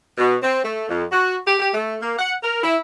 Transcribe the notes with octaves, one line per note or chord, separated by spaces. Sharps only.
B2
C4
A3
F2
F#4
G4
G4
A3
A#3
F#5
A#4
E4